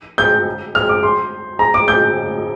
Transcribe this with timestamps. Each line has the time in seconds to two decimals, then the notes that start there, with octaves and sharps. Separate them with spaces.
0.18 G6
0.75 F6
0.89 D6
1.03 C6
1.59 A#5
1.74 D6
1.88 G6